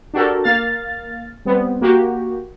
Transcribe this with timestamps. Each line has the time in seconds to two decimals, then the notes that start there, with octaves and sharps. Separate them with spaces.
0.14 D4 F#4 G4 A4 A#4
0.44 A#3 F5 F6 A6
1.45 G3 B3 C4
1.81 A#3 F#4 G4